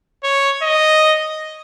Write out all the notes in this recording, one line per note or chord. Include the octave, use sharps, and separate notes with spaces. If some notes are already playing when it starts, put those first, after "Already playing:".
C#5
D#5